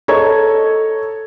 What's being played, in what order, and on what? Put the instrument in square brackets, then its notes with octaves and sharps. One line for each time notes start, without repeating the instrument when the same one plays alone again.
[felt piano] A4 C#5 D#5 A#5 C#6 G#6